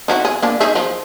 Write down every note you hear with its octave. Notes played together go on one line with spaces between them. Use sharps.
D#4 E4 F#4
G#4
A#3 D4
D#4 G#4 E5
F3